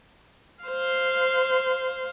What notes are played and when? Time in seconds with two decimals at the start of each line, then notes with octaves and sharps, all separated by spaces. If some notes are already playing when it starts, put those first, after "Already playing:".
0.64 C5 F5